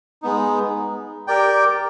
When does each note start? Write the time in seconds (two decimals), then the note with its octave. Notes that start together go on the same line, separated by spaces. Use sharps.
0.22 G#3 B3 D#4
1.27 G4 A#4 D5 G5